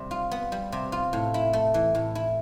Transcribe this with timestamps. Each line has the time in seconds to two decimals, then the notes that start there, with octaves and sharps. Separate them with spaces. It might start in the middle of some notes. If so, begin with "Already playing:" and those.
Already playing: C3 G3
0.11 F4
0.31 B3
0.52 G3
0.72 C3
0.92 F4
1.13 A2
1.34 E4
1.53 A3
1.74 E3
1.95 A2
2.15 E4